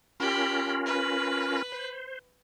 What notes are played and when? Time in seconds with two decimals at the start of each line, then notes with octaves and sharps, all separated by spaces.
0.20 C#4 F4 G4 A#4 B5
0.86 B4
1.72 C5